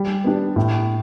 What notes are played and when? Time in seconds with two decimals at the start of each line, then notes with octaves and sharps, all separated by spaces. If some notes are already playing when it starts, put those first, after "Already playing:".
Already playing: G3
0.24 B3 D4 G4
0.56 A2